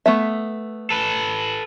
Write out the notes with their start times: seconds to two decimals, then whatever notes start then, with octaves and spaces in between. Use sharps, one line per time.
0.06 A3 B3 E5
0.90 A4 B4